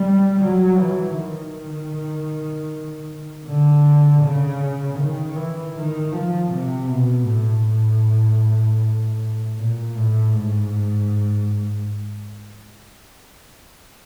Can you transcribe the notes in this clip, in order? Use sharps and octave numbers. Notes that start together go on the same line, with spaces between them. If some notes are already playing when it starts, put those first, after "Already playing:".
Already playing: G3
F#3
E3
D#3
D3
C#3
D#3
E3
D#3
F3
C3
B2
A2
A#2
A2
G#2